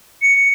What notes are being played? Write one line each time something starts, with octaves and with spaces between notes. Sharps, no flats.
C#7